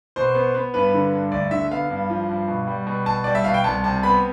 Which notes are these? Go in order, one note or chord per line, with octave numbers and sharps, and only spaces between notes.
B2 C5
B3
B3
G2 B4
D3
G2
D2 D5
D3 E5
B3 F5
G2
F3
G2
B2
G3
B2
B2 A5
G3 D5
E5
B2 F5
G5
C2 A5
C3 A5
B3 B5